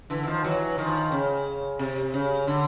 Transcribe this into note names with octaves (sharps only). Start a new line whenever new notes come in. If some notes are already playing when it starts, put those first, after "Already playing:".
D3 E3
E3
D#3 F3
E3 F#3
D#3 F3
C#3
C3
C#3
D3